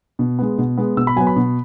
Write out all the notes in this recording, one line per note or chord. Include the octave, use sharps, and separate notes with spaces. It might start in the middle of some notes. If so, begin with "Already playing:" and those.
B2
G#3 B3
B2
G#3 B3
B2 E6
B5
F#3 B3 G#5
B5
B2